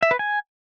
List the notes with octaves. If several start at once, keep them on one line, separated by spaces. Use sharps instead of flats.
E5
B4
G#5